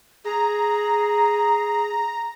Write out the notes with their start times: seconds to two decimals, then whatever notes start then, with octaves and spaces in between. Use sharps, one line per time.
0.25 G#4 A#5